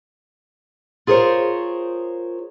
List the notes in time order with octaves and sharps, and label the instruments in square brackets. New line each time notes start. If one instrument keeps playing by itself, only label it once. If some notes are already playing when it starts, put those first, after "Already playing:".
[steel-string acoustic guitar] F4 G#4 A#4 C5 C#5